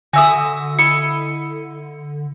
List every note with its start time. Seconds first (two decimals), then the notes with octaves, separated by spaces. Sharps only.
0.13 D3 F#4 E5 G#5 D#6
0.79 E4 D#5 C#7